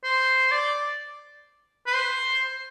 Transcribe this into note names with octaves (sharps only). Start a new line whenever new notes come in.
C5
D5
B4
C5